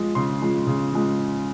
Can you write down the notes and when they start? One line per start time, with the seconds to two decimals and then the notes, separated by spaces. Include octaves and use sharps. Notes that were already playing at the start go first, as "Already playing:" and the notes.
Already playing: F3 G#3
0.15 C#3 C6
0.41 F3 G#3
0.67 C#3
0.93 F3 G#3